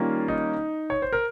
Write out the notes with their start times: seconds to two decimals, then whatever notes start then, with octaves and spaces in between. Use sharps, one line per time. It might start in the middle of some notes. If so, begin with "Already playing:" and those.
Already playing: D#3 G3 A#3 C#4 F4
0.28 D#4
0.90 C#5
1.02 C5
1.13 A#4